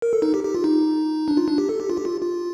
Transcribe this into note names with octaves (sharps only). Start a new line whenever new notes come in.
A#4
A4
D#4
G4
G4
F4
D#4
D4
F4
D4
G4
A4
G4
F4
G4
F4
F4